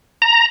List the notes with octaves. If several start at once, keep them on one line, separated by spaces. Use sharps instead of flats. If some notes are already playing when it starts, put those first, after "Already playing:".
A#5